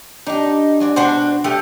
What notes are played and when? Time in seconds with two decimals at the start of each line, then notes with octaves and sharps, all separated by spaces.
0.27 D4 D#4 G4
0.80 G#3 F#4 D5
0.96 B2 D4 F#4 C5 A5
1.44 F3 A3 G4